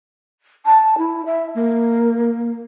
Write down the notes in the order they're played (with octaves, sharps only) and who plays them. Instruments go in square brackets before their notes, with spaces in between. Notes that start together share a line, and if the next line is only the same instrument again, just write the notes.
[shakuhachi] A5
E4
E5
A#3